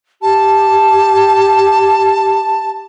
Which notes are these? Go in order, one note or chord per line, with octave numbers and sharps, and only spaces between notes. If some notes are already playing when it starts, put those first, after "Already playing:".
G4 A5